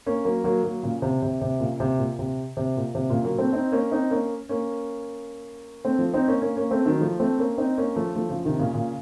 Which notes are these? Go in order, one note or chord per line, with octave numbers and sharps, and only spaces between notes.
A#3 C#4
F#3 A#3
F#3 A#3
F#3 A#3
A#2 C#3
C3
C3
C3
A#2 C#3
C3
A#2
C3
C3
A#2
C3
A#2 C#3
F#3 A#3
A3 C4
C4 D#4
A#3 C#4
C4 D#4
A#3 C#4
A#3 C#4
A3 C4
F3 A3
C4 D#4
A#3 C#4
A#3 C#4
A#3 C#4
A3 C4
D#3 F#3
F3 A3
A3 C4
A#3 C#4
C4 D#4
A#3 C#4
F3 A3
F3 A3
C#3 F3
C3 D#3
A#2 C#3
A#2 C#3